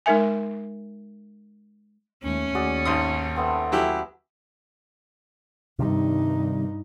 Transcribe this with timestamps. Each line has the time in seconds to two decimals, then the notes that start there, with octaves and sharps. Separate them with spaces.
0.06 G#3 D#4 A#4 E5 G#5
2.24 D#2 A3 C#4
2.55 D#2 F#4 G#4 D5
2.85 G#1 C6 D#6
3.36 A3 B3 C4
3.72 F#3 A3 C#4 E4 G4
5.79 G2 C3 D#3 G3 D#4